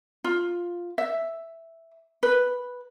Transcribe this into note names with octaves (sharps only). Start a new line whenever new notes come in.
F4
E5
B4